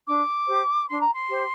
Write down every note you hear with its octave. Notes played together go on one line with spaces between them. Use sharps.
D4 D6
G4 C5
D4 C6
A#5
C6
G4 C5